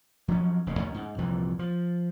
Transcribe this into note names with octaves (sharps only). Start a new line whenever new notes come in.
F3 F#3 B3 C#4
F1 D#2 C#3
C#2 D#3 C#4
G#2
C2 F2 A#2 E3
F3